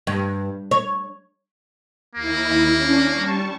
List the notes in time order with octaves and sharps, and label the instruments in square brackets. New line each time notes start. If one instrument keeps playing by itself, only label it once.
[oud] G2
C#5
[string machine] D#2 E4 [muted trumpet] A#3
[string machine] C#4 D4
G3 A5 C#6